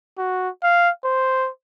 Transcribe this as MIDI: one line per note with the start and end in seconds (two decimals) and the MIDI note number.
0.18 0.49 66
0.64 0.90 77
1.04 1.49 72